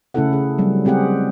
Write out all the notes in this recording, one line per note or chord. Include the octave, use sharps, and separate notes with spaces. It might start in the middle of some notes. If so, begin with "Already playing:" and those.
C#3 A3 C#4 E4 A4 F#5
G#4
F#3 G3 C4
G#3 C4 G4 G#4 F#5